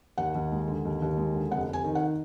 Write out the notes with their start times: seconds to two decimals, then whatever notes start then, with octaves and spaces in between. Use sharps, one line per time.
0.18 D#2 F#5
0.35 D#2
0.52 G#3
0.68 D3
0.85 D#2
1.02 D#2
1.18 G#3
1.34 D3
1.51 F1 F#5
1.68 F1
1.73 G#5
1.84 D#3
1.95 F#5